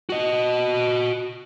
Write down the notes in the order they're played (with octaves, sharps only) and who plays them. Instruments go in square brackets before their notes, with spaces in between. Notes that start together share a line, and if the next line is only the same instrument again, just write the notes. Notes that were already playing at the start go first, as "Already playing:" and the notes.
[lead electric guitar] F#4 D#5